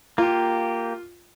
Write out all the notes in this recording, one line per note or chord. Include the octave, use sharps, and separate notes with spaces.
A#3 F4 G4